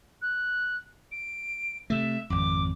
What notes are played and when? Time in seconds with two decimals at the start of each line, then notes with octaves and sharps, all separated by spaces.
0.22 F#6
1.12 D7
1.90 C3 A3 E5
2.30 G#1 F2 D6